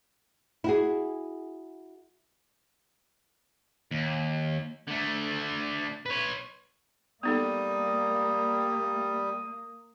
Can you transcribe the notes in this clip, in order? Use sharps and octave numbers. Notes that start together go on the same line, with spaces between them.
E4 F#4 G#4
D#2
D3 A3
B4 C#5
G3 A#3 B3 D#4 A4 D#6